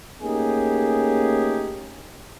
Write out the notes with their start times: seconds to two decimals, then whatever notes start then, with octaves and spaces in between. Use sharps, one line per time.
0.21 A3 A#3 C#4 D#4 G4 G#4